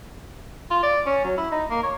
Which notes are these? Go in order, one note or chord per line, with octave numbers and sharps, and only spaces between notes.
F4
D5
C#4
F#3
E4
D#4
A#3
C#5